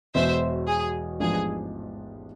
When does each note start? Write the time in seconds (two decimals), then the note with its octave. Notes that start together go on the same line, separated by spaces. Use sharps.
0.14 E1 E2 B2 C5 E5
0.67 G#4
1.20 A1 G#2 F3 B3 D4 G#4